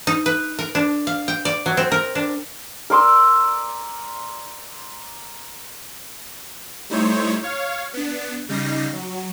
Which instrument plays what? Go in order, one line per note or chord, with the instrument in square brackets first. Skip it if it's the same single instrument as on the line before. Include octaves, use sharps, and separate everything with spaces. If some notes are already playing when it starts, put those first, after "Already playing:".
[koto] D#4
B4
A#4
D4
F5
G5
D5
F#3
C4
A#4
D4
[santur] A#4 D5 C6 E6
[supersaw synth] G3 A3 D#4 E4 C5 C#5
C#5 F5
B3 D4
C#3 G3 D#4 A#6 C7
F#3